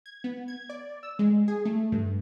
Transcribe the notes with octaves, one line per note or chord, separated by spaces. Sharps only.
G#6
B3
G#6
D5
E6
G#3
G#4
A3
G2